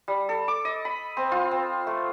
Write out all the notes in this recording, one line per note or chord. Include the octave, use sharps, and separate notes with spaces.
G3
A4
D6
D#5
B5
C4
F4
C4
A3